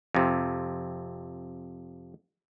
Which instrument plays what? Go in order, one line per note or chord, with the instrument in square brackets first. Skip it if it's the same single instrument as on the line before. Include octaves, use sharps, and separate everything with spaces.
[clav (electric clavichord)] F2 C3